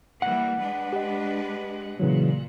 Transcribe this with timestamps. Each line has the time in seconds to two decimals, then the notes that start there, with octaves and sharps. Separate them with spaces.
0.22 E3 G3 A#3 F#5
0.59 G#3 D4 B4
0.93 G4 D#5
2.00 A#2 C#3 E3 F#3